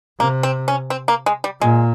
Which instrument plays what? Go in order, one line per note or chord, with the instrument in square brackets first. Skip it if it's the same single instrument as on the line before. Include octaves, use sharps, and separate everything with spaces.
[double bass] C3 [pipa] A#3
[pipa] C4
C#4
C4
A#3
G#3
G3
[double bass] A#2 [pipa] G#3